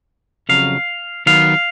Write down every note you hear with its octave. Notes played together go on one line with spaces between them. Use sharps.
F2 C#3 F#3 F5
D#3 F#3 B3 F5